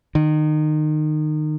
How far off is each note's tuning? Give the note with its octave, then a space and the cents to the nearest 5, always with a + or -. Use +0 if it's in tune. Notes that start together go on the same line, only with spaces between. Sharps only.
D#3 -25